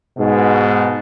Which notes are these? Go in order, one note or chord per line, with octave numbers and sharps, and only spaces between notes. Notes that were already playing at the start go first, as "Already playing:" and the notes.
G#2 B2